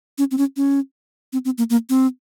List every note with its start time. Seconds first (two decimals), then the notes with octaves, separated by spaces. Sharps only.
0.18 C#4
0.31 C4
0.38 C#4
0.57 C#4
1.33 C4
1.45 C4
1.58 A#3
1.70 A#3
1.90 C4